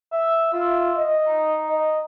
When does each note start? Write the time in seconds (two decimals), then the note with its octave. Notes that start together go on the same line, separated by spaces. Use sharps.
0.12 E5
0.53 F4 E5
0.96 D#5
1.27 D#4
1.69 D#5